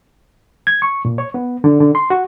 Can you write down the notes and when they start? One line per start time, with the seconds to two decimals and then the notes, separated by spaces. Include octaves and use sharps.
0.67 G#6
0.82 C#6
1.05 A#2
1.18 C#5
1.34 B3
1.64 D3
1.80 D3
1.95 C6
2.10 F#4